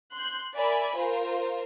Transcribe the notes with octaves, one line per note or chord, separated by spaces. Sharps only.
C6 F#6 G6
A#4 D5 E5 G#5 B5
F4 A#4 C5